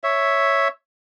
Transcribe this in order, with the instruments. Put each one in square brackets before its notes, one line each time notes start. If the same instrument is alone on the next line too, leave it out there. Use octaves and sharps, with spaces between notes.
[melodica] C#5 E5